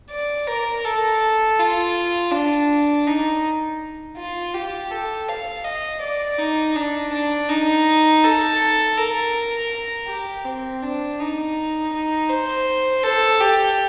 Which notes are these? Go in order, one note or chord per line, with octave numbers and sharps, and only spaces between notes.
D5
A#4
A4
F4
D4
D#4
F4
G4
A4
F5
D#5
D5
D#4
D4
D4
D#4
A4
A#4
G4
C4
D4
D#4
D#4
C5
A4
G4